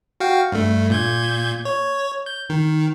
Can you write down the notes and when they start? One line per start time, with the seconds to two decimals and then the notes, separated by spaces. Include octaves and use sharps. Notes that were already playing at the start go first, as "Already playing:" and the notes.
0.20 F#4 F5 G5
0.52 G2 A3
0.90 A#2 G6 G#6
1.65 C#5
2.26 G6
2.49 D#3